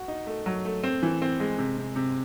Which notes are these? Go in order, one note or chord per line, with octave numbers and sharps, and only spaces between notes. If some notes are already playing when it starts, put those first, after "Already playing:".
Already playing: F#4
D#4
A3
F#3
A3
C4
E3
C4
G#3
C3
C3
C3